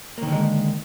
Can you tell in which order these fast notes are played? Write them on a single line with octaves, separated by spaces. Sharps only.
A#3 D#3 D3 G#3